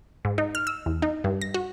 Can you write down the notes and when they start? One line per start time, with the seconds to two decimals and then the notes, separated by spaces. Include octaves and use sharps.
0.25 G#2
0.38 D#4
0.55 F6
0.67 E6
0.86 E2
1.02 D#4
1.24 G2
1.42 A#6
1.54 F#4